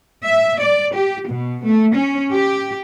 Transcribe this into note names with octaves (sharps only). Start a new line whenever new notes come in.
E5
D5
G4
B2
A3
C#4
G4